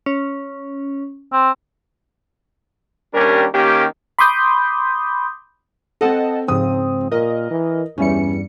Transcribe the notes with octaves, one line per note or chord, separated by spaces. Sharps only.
C#4
C4
D#2 G3 C#4 D4 G4 A#4
D#3 A#3 C#4 G4
B5 C6 D6 D#6 G6
C4 A4 D#5 F#5 A5
G#2 C#3 F3 C4 D#6
A#2 A#4 D#5
E3
E2 G2 G3 C#4 E4 C#7